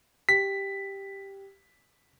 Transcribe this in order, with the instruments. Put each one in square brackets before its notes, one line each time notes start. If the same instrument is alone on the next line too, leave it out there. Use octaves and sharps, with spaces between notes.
[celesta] G4 G5 [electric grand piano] B6